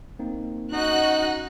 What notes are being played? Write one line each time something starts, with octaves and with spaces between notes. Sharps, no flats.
A#3 C4 D#4
C#4 D#4 F#4 D#5 F#6